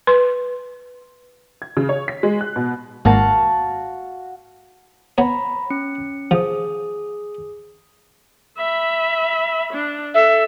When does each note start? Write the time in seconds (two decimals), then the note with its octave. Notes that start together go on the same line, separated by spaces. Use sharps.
0.07 B4 C6
1.62 G#6
1.77 C#3
1.89 C#5
2.08 B6
2.23 G#3
2.41 F#6
2.56 B2
3.05 G#1 G#2 A#3 F#4 F5 A5
5.18 B3 C#5 A#5 B5
5.70 C#4 C#7
6.31 F3 G#4 D#6
8.58 E5 B5
9.73 D4
10.14 A4 E5